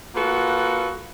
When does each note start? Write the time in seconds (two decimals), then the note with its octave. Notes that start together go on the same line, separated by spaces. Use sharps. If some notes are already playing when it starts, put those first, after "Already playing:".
0.15 A#3 F4 F#4 A4 B4 F#5